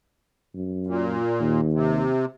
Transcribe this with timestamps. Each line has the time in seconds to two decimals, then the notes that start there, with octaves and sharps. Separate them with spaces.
0.54 F#2
0.87 A#2
1.40 D#2
1.73 C3